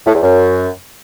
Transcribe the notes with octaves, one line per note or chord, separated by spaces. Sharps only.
A2
E2
F#2